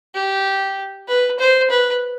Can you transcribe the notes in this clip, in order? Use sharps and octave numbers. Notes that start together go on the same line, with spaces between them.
G4
B4
C5
B4